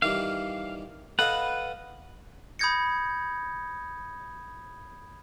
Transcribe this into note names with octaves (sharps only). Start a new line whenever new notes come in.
D#3 E3 G3 F5
A4 B4 D#5 F5 F#5
B5 D#6 G6 G#6 A#6 C#7